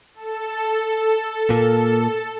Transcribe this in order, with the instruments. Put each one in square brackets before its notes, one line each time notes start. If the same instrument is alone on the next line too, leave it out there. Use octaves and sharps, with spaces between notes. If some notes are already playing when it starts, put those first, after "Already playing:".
[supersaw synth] A4
[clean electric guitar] A#2 A#3